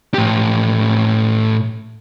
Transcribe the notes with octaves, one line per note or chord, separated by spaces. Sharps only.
A2 G4